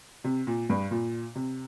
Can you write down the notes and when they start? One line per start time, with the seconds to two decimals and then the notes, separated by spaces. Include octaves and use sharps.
0.24 C3
0.47 A#2
0.69 G2
0.91 A#2
1.35 C3